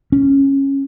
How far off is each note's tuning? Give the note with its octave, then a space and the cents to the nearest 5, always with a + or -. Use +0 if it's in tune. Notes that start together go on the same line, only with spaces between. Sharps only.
C#4 -15